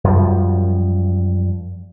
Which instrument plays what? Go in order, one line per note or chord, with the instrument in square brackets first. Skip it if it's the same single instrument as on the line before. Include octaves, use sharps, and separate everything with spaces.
[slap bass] F#2 F3 G3